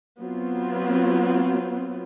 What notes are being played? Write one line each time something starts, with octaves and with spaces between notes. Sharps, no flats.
F#3 B3 C4 F4